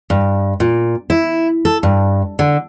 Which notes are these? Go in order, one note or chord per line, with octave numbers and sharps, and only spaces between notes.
G2
A#2
E4
A4
G2
D3